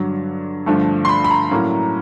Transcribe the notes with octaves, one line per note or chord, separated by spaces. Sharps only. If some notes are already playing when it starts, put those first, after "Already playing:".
Already playing: G2 D3 F#3
G2 D3 F3 A3
C6
B5
B5
A#5
A2 F#3 A#3 C#4 E4